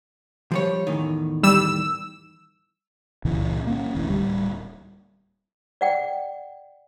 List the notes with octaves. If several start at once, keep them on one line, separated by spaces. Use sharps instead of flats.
F3 G3 C#5
E2 A2 D#3
G3 E6
C#2 A#2 C#3 E3
A#3 B3 C#4
F1 D2 E3
D1 G3
D5 F#5 G5